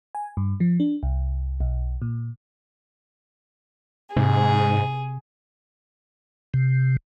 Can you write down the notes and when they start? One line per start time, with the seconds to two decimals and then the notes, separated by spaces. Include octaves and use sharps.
0.15 G#5
0.37 G2
0.60 F3
0.80 D4
1.03 C2
1.60 B1
2.02 A#2
4.17 G#2 C3 G#4
6.54 C3